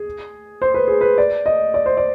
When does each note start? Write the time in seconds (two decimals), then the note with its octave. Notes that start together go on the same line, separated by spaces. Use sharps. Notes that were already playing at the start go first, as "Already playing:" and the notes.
Already playing: G#4
0.62 C5
0.74 B4
0.88 G#4
1.01 B4
1.18 D5
1.46 D#5
1.74 D5
1.86 C5
1.97 D5